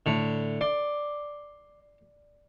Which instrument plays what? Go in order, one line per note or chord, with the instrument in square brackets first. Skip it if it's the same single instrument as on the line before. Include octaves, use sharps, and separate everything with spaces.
[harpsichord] A2 D3
[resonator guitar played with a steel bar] D5 [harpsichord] C6